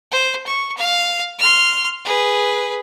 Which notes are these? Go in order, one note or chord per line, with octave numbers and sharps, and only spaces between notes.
C5
C#6
F5
C6 F6
G#4 B4